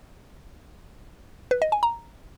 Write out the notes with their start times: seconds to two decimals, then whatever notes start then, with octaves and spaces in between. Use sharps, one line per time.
1.51 B4
1.62 D#5
1.72 G#5
1.83 A#5